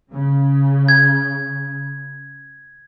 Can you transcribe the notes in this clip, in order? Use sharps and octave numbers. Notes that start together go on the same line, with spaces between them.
C#3
G#6